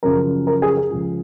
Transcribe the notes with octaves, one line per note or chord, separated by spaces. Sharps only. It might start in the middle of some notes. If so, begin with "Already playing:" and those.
F#2 C#3 F3 A#4
A#4
G#4
G#4
C#2 C#3 F3